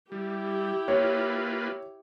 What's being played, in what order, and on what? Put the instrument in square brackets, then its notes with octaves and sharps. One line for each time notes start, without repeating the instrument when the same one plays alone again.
[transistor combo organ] G3 [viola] E4 G4
[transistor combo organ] A#3 F4 B4 [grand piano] C#5